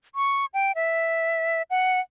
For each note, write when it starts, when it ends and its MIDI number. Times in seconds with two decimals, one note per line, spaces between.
0.15 0.46 85
0.54 0.72 79
0.75 1.62 76
1.70 2.00 78